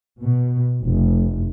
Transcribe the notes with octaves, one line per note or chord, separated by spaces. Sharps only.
B2
F1